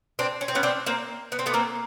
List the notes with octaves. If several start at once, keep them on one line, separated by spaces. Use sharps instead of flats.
C4 D4
C#4
C4
B3 C#4
C4 D4
A#3 C4
B3
C4
A3 B3
A#3 C4